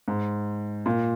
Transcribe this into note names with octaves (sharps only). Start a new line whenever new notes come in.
G#2
A#2